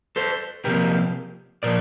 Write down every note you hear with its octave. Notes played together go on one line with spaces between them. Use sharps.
A4 C5
C3 F3 A#3 G4 A#4
A#2 F3 A#4 D5